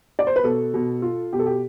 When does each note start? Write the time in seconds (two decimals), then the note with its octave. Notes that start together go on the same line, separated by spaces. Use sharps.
0.19 D5
0.27 C5
0.36 B4
0.43 B2 A4
0.74 B2
1.02 F4
1.33 B2 G4
1.39 A4
1.46 G4